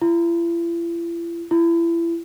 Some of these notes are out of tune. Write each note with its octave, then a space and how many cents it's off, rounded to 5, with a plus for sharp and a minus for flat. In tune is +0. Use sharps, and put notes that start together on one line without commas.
E4 +45
E4 +30